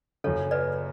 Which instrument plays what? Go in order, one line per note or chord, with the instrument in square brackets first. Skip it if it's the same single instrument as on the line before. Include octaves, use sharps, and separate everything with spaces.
[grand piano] F#1 F#2 C#3 [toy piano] A4 C#5
[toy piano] B4 D5